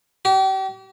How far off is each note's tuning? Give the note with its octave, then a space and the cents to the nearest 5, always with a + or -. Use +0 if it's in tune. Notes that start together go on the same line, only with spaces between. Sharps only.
G4 -40